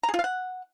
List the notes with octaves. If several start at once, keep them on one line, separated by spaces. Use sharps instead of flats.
A#5
G#4
F4
F5
F#5